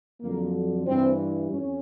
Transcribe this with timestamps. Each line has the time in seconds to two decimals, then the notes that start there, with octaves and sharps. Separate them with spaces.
0.21 F2 D3 F#3 A#3
0.86 G2 E3 C4
1.51 F2 C#4